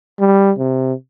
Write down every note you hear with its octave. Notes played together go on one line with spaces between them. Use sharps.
G3
C3